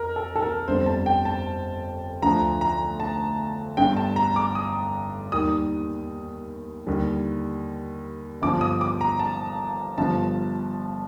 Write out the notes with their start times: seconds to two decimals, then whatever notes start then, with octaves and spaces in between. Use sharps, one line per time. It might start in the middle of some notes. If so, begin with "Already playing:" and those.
Already playing: F2 A#4
0.16 A4
0.36 A4
0.42 A#4
0.68 G1 F2 D3 G3 C5
0.86 A5
1.06 G5
1.25 A5
2.22 D2 D3 F3 A#5
2.61 A#5
3.00 A5
3.77 G1 G2 D3 G5
3.97 A5
4.16 A#5
4.36 D6
4.55 D#6
5.32 D#2 D#3 G3 D#6
6.87 D#2 D3 G3
8.42 G1 G2 F3 D6
8.61 D#6
8.81 D6
9.01 A#5
9.19 A5
9.98 G1 G2 F3 A5